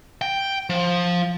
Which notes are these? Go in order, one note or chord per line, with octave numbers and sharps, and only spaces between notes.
G5
F3